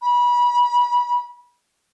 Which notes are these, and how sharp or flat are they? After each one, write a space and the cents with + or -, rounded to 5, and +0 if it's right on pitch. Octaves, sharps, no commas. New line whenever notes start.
B5 -30